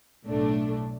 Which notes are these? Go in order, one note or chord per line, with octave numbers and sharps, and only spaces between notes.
B1 A2 A3 D4